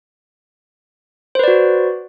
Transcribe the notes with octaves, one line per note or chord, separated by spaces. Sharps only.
F#4 B4 C5 D5